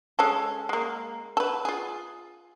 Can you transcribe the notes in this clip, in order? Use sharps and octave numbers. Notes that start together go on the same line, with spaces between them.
G#3 C#4 A4
G#3 A#3
A4 B4
F4 G#4